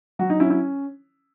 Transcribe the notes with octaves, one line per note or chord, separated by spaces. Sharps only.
F#3 F#4
D#4
C#4 E4
E4